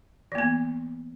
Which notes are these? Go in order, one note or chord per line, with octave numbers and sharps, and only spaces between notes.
E3 A#3 B3